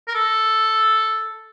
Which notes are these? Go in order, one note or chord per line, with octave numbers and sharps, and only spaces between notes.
A#4
A4